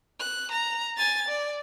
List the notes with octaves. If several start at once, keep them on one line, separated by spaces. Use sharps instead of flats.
F#6
A#5
G#5 A6
D5